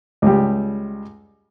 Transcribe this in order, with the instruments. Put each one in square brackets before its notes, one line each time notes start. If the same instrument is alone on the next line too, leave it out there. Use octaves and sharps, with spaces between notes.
[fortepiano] C#2 G3